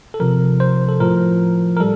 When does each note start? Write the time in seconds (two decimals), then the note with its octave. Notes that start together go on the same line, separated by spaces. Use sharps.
0.14 A4
0.20 C3 F3 A#4
0.60 C5
0.89 A4
1.00 A2 F3 A#4
1.76 A#4
1.80 G3 A4